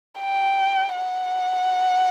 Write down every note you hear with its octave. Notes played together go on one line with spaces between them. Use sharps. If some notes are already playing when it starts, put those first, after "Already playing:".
G5
F#5